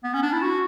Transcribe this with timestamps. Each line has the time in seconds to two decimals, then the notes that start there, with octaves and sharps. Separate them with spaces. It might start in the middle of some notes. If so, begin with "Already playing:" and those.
0.04 B3
0.14 C#4
0.23 D4
0.33 E4
0.42 F#4